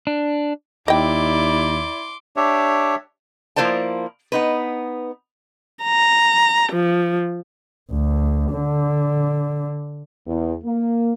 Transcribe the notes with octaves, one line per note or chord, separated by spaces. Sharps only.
D4
D#2 E4 D5 D#5 G5 C6 D6
D4 G4 C#5 E5
F3 A#3 E4 C5 D5 A5
B3 D#4 B4
A#5
F3
D2
D3
E2
A#3